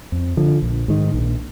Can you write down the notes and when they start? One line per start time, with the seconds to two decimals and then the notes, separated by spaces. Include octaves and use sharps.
0.12 F2
0.37 D3 F3
0.62 A#1
0.88 G#2 D#3
1.14 A#1